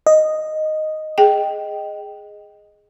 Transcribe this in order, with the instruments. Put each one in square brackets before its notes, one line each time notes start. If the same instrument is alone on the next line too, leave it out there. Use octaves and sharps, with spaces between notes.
[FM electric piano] D#5
[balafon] G#4 G5